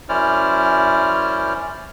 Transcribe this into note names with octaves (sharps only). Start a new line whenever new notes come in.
F#2 C#4 E4 C5 D5 F6